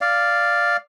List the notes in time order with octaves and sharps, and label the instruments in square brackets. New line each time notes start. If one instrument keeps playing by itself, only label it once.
[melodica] D5 F5